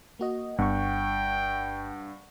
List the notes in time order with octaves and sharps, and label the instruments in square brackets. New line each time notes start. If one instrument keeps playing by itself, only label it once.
[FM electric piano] A#3 F#4 D#5
[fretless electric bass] G1 B3 [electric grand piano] G2 [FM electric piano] F#5 C#6 [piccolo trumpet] G5